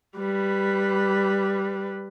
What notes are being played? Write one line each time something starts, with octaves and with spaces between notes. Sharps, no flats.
G3 B4